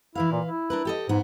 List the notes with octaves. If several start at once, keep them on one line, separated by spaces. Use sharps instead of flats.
E3 E4 B4 F5
A#2
E4
D4 A#4 B4
G4 A4 D#5
G#2 B3